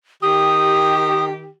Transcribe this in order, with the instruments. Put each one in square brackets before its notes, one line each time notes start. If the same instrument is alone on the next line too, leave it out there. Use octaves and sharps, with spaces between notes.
[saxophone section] D#3 G4 [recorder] D#6